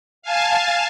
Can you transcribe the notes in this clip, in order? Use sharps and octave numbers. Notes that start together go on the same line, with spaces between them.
F5 G#5 A5